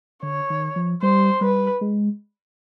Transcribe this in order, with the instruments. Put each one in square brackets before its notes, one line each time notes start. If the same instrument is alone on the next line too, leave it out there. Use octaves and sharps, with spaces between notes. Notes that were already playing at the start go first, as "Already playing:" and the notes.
[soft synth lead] D3 [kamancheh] C#5
[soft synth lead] D#3
F3
[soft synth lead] G3 [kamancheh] C5
[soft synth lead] G3 [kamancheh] B4
[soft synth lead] G#3